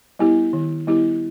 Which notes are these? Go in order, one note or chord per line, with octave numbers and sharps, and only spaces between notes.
G3 B3 E4 G4
D#3
G3 B3 E4 G4